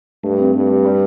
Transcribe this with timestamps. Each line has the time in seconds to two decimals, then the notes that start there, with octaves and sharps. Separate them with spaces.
0.23 G2 A3
0.38 C4
0.54 G2
0.69 G3
0.85 G3